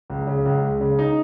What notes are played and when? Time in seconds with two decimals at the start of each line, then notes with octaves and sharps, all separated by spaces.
0.10 C#2
0.27 C#3
0.46 C#2
0.62 G#3
0.81 C#3
0.99 D#4